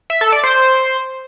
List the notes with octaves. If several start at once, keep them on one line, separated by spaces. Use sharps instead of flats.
E5
A4
D5
C5